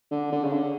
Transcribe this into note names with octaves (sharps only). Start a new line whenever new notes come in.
D3
D3
C#3
D3